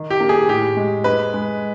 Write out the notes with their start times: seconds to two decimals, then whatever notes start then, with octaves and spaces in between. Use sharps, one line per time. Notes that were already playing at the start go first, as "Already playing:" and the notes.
Already playing: D#3
0.10 G4
0.20 A#3
0.29 G#4
0.48 A2 G4
0.77 G#3
1.04 G#3 B4
1.34 G#3